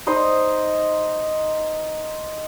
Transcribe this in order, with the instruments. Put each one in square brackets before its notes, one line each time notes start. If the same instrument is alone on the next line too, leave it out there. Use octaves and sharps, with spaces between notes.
[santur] D#4 C5 D#5 D#6